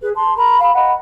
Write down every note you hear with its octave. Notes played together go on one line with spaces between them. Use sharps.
G#4 B4
A5 C6
A#4 A#5 B5
F5 B5
D#5 F#5 B5